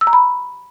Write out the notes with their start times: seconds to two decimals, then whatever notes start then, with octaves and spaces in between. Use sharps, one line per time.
0.01 E6
0.07 A#5
0.13 B5